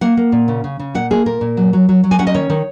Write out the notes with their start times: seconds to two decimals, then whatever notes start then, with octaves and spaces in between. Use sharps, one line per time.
0.01 A#3 F#5
0.17 A#3
0.32 A#2
0.48 C#3
0.64 C#3
0.79 C#3
0.94 A#2 F#5
1.10 A#3 G#4
1.26 A#2 A#4
1.41 A#2
1.57 F#3
1.73 F#3
1.89 F#3
2.04 F#3
2.11 G#5
2.19 C#4 F#5
2.27 D#5
2.34 D#3 C#5
2.50 D#3